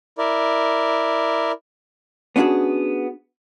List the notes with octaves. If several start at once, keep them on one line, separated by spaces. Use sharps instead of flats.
E4 A#4 D5
B3 C#4 D4 F4 F#4 G#4